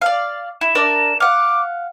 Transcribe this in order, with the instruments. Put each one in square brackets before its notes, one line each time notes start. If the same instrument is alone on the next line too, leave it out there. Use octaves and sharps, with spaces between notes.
[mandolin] D5 F5
[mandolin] E4 [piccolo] E7
[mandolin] D4 A#4 D5
[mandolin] F5 F#5 [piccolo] D6